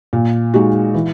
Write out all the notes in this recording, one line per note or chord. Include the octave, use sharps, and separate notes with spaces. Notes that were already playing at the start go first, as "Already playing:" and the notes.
A#2
G#3 D#4 F#4
E3